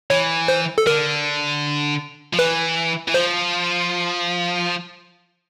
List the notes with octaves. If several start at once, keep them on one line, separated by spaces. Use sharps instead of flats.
E3 C#5
C5
A4
D3 A#4
F3
E3 B4
E3
F3 C5